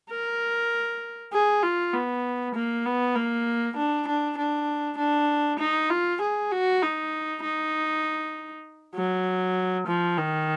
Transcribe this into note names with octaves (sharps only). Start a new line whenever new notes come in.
A#4
G#4
F4
B3
A#3
B3
A#3
D4
D4
D4
D4
D#4
F4
G#4
F#4
D#4
D#4
F#3
F3
D#3